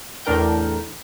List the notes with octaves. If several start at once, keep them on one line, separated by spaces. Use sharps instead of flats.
E2 A2 D4 A#4 G5 G6